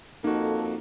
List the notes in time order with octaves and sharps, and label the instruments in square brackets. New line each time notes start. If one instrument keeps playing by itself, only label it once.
[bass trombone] F2 [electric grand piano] A#3 F#4 [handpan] D#4 [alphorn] A4